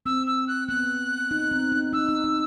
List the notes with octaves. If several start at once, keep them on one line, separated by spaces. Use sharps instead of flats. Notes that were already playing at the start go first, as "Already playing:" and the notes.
C4 E6
E6
F#6
B3 F#6
D#4
C4
D#4
D#4 E6
D#4
D#4